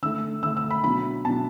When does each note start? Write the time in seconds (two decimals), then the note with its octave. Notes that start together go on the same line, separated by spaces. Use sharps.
0.02 D3 A3 D4 E6
0.43 D3 A3 D4 E6
0.57 E6
0.71 B5
0.83 B2 F#3 D4 B5
1.25 B2 F#3 D4 A5